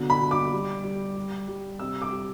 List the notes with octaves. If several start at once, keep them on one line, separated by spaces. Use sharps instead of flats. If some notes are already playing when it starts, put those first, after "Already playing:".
Already playing: B2 D3
B5
B2
D6
G3
G3
G3
G3
C3 E6
D6
G3